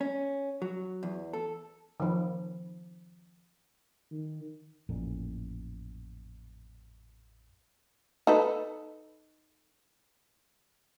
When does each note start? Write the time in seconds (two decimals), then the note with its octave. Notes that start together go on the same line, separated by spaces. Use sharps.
0.01 C#4
0.62 F#3
1.03 E2
1.33 A4
2.00 D#3 F3
4.11 D#3
4.89 A1 F2 A#2
8.27 D#4 A4 B4